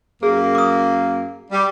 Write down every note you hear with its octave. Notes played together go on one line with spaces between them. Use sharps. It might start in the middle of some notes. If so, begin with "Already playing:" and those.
F#2 A#3 G#4
D6 D#6
G3